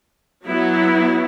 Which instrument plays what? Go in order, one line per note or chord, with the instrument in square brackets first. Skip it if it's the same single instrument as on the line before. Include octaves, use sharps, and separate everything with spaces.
[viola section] F#3 B3 E4